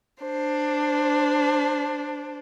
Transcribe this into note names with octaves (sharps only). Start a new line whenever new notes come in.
D4 C5